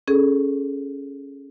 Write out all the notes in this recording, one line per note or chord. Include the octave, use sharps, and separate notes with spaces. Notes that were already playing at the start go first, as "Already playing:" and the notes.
C#4 G#4 A4